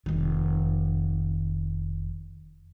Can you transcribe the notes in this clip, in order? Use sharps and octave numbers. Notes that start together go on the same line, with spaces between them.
F1 D#3